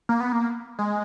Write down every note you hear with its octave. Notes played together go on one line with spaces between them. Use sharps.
A#3
B3
A#3
G#3